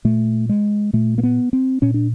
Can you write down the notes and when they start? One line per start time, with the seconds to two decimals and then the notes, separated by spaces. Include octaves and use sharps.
0.05 A#2 A3
0.49 G#3
0.93 A#2 A3
1.18 A#3
1.23 B3
1.53 C4
1.82 A#2 C#4
1.94 D4